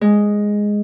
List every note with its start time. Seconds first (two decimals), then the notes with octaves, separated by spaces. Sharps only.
0.01 G#3